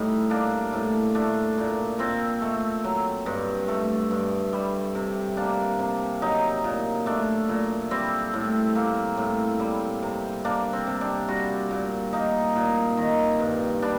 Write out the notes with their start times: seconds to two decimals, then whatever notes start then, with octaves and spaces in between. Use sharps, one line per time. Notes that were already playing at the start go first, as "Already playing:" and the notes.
Already playing: A2 G3 D#4
0.30 A#3 D4
0.73 A2
1.15 A3 D4
1.58 A#2
1.99 A#2 C4
2.42 A3
2.85 F#3
3.26 G2
3.68 A3
4.11 G2
4.53 G3
4.95 C3
5.37 A#3 D4
5.79 C3
6.22 F#3 D#4
6.64 A#2
7.06 A3 D4
7.49 A#2
7.91 G3 C4
8.34 A2
8.75 A#3
9.17 A2
9.60 G3
10.03 C3
10.45 A#3 D4
10.73 C4
10.87 C3
11.01 D4
11.28 G3 F#4
11.71 A#2
12.13 A#3 D#4
12.56 A#2
12.97 D#3
13.39 G2
13.82 G3 D4